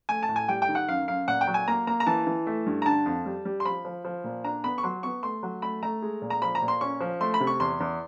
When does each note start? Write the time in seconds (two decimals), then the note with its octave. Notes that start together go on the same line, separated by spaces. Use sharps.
0.09 A3 G#5
0.23 A5
0.29 A2
0.36 G#5
0.48 G3 G5
0.62 G5
0.68 D#3
0.75 F#5
0.88 F#2 F5
1.08 F#2 F5
1.28 A#2 F#5
1.41 G5
1.47 F#3
1.54 G#5
1.68 A#3 A#5
1.87 A#3 A#5
2.00 A#5
2.07 E3 A5
2.27 E3
2.47 A3
2.66 G2
2.82 A#5
2.86 D3 A5
3.06 F2
3.26 G3
3.45 G3
3.60 C6
3.65 F3 B5
3.85 F3
4.05 F3
4.24 A#2
4.44 D4 A#5
4.64 B3 B5
4.78 C#6
4.83 F#3 C6
5.03 B3 C#6
5.23 A3 C6
5.43 F#3
5.62 A3 B5
5.83 A3 A#5
6.02 G#3
6.22 A#2
6.30 A#5
6.42 F3 B5
6.55 A#5
6.62 A#2
6.68 C6
6.81 C#4 C#6
7.01 F3
7.21 A3 C6
7.34 B5
7.40 C3
7.47 C#6
7.60 E2 C6
7.80 E2